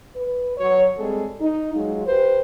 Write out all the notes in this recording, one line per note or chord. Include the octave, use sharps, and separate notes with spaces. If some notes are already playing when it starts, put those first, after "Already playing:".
B4
F#3 F#4 C#5
G3 G#3 C4 G#4 A4
D#4
F#3 G#3 F4
G4 B4 C5